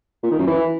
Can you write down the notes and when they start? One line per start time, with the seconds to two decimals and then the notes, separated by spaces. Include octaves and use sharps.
0.23 A#2
0.31 D#3
0.39 F#2
0.47 E3